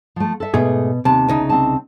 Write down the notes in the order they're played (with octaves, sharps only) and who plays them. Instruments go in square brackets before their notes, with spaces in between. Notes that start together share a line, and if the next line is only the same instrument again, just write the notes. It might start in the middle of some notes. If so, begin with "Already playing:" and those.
[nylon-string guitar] F3 A3
A4 E5
[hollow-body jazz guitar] G#2 A3 G#4 [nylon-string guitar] B2
[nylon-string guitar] D#2 A5 [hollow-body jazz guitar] C3
[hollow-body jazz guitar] C2 C#3 D#4
[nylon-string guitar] C4 A5